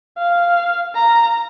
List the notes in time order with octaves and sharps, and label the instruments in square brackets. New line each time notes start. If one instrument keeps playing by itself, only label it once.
[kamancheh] F5
A#5